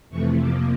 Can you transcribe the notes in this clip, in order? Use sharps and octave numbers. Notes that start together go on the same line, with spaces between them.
F2 C3 E3 A3 C#6
F2 C3 F3 A#3 D6